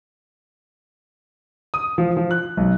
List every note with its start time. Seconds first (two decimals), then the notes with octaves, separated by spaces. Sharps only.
1.74 D#6
1.98 F3
2.17 F3
2.31 F#6
2.57 B1